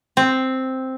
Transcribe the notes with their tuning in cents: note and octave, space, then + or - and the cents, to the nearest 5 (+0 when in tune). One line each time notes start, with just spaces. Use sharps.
C4 +0